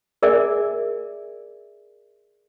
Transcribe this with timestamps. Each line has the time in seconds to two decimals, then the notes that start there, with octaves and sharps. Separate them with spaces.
0.23 G#4 A#4 D5 E5 G#5